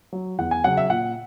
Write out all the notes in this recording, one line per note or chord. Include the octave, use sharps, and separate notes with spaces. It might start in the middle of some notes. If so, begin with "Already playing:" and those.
F#3
E2 F#5
G#5
C#3 F#3 F#5
E5
A#2 F#5